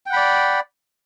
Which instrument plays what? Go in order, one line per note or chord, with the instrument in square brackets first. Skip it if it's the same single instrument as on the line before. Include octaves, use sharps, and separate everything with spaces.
[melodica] G5
F#5
B5
D5